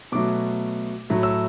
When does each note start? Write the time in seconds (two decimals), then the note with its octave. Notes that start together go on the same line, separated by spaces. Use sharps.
0.12 B2 F#3 A3 D6
1.10 A2 F#3 A3
1.23 E6